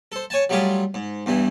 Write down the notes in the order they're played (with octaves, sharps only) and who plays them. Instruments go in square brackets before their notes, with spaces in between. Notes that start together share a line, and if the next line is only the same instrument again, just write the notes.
[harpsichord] A4 C5
C#5 G#5 A5
F#3 G3 A3 F4 G4 G#4
G#2
E2 G2 E3